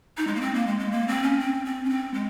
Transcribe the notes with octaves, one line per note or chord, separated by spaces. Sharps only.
D#4
G#3
A#3
C4
A#3
G#3
G#3
A#3
C4
C#4
C4
C4
C#4
C4
G#3